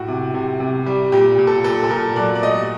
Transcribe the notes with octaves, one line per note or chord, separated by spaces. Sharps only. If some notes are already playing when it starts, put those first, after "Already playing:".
Already playing: A2 F#4
C3
C3
C3
G3
A#2 G4
A#2
A4
A#2 A4
A4
A#2 A#4
F#3 D5
D5
A3 D#5